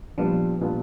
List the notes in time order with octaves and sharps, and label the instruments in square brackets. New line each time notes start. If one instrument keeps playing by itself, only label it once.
[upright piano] A#2 G3 B3 D4 F4 [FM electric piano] F3
[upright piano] A#2 G3 B3 D4 F4